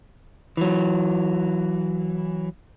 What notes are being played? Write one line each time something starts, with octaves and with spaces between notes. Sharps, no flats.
E3 F#3